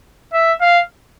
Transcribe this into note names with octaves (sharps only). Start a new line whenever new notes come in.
E5
F5